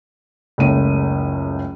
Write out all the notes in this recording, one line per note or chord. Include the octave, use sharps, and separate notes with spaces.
F#1 C#2 A3 C#4 D#7